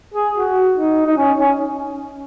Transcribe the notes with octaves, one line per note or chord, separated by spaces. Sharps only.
G#4
F#4
D#4
D#4
C#4
C#4